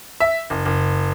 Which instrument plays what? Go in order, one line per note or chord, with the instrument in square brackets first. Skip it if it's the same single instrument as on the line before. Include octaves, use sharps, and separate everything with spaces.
[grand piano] E5
F#1
F#1